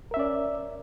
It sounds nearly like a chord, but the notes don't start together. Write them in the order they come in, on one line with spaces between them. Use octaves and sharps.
A#4 E5 C#4 D5